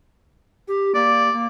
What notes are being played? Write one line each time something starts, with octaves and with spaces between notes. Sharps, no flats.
G4
A#3 D5
A#3